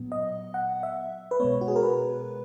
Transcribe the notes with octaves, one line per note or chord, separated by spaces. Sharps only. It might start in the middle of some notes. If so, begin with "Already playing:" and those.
Already playing: A#2 F#3 B3
D#5
F#5
E5
B4
B2 G#3 B3 C#5
F#4
G#4
A#4
B4